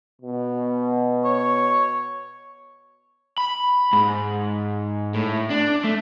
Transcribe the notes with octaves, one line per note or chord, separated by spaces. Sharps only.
B2
C#5
B5
G#2
A2
D4
A3